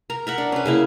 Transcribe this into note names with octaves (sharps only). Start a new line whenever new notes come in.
A#4 A#5
A#4 E5 F#5
D4
C#4 B4
C#3 A#3 E4